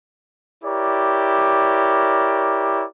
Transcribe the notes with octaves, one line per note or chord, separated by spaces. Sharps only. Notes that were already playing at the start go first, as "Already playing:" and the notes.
E4 G4 A#4 C#5 D5